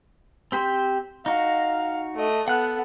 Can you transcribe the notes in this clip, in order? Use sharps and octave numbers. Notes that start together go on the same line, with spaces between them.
C4 G4 C5
D#4 F#4 F5
A3 D#5
B3 A4 F#5 F#6